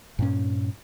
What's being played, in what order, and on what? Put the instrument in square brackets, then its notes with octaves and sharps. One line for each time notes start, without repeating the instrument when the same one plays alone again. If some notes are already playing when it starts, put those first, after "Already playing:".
[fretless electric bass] G2 A#2 C#4